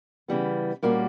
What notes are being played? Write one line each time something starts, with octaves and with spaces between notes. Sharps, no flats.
C#3 E3 G3 B3
A#2 G3 A#3 C#4 F#4